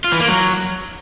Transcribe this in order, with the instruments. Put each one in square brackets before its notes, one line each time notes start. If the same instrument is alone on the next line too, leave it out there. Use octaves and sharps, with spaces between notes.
[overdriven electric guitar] F4
E3
A#3
F#3